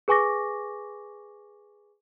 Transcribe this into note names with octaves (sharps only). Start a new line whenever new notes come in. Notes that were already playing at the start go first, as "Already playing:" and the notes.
G#4 B4 G#5 C#6 D6 A#6